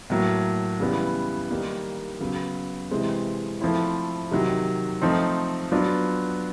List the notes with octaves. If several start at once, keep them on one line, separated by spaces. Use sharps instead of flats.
A2 F#3 A#3
C#3 E3 G3 B3
D#3 G3 A#3 D#4
C#3 F#3 B3
C3 E3 G#3 C4
F3 A3 C4 E4
C3 D#3 F#3
F3 A3 C4 D#4
F#3 B3 D4 F4